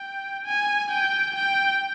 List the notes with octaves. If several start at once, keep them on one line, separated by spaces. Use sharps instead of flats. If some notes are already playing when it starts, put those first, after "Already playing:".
Already playing: G5
G#5
G5
G5